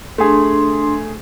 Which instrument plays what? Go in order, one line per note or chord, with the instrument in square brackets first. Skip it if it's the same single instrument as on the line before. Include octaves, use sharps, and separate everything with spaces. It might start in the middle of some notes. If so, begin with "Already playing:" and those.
[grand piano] A3 G#4 [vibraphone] D4 C6